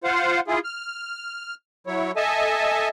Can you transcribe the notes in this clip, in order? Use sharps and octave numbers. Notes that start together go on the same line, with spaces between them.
F4 C5 F5 F#5
E4 F4 G#4
F6
F#3 E4 C#5
A4 D#5 E5 G#5 A5